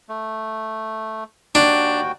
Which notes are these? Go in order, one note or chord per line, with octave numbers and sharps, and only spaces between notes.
A3
D#2 D4 F#4 G5